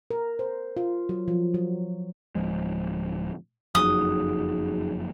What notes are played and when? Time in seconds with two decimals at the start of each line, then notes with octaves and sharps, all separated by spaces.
0.10 A#4
0.39 C5
0.77 F4
1.09 F#3
1.28 F3
1.54 F#3
2.35 D1 F3 G#3
3.75 F#1 F2 F#3 D#4 F#4 G#4 D#6